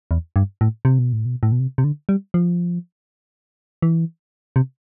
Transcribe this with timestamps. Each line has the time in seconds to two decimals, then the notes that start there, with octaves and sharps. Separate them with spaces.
0.11 E2
0.36 G2
0.61 A2
0.85 C3
0.99 B2
1.13 A2
1.25 B2
1.43 A2
1.52 B2
1.60 C3
1.78 C3
1.84 D3
2.09 G3
2.34 F3
3.82 E3
4.56 C3